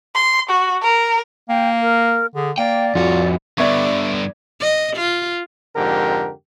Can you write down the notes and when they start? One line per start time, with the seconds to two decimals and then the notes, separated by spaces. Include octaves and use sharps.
0.15 C6
0.50 F#4
0.82 A#4
1.49 A#3 G5
1.81 A#4
2.35 D3 G#4
2.58 A#3 D5 G5
2.95 F2 F4 F#4
3.58 G2 D3 B3 D5 E5 C#6 G#6
4.61 D#5
4.96 F4
5.76 F2 G#2 D3 G4 A#4